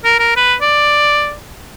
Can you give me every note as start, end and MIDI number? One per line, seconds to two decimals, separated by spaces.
0.05 0.18 70
0.19 0.36 70
0.37 0.55 71
0.62 1.35 74